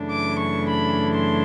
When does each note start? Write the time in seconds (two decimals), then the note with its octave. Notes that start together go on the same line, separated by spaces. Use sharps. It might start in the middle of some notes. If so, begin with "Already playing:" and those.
Already playing: F#2 C#3 E3 A3 D4
0.12 D6
0.41 C#6
0.69 B5
1.14 C6